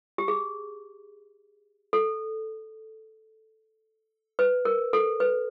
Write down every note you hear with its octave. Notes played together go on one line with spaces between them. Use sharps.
G4
G#4
A4
B4
A#4
A4
B4